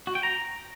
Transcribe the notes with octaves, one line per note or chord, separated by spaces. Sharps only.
F#4
G5
A#5